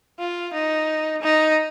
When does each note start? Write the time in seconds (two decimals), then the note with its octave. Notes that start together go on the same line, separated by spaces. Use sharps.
0.19 F4
0.53 D#4
1.22 D#4